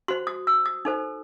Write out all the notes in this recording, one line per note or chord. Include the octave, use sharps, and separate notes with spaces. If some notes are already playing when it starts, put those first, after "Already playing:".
F#4 C5 C6
D#6
E6
D#6
D#4 A4 C5